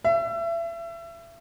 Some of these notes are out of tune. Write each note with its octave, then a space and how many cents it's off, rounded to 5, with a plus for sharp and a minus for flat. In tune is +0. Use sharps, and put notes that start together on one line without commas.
E5 +30